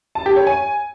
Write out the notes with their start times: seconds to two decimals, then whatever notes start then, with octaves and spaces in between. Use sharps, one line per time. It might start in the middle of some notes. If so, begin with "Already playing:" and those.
0.15 A5
0.26 G4
0.36 C#5
0.47 G#5